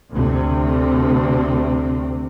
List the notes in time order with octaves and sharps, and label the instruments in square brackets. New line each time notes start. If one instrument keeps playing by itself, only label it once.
[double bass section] D2 C3